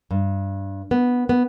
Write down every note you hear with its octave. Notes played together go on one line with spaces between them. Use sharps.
G2
B3
B3